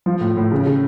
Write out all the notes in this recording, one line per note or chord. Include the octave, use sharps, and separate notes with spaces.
F3
A2
A2
C#3
C#3